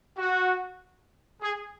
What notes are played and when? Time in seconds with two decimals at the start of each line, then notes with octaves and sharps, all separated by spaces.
0.18 F#4
1.42 G#4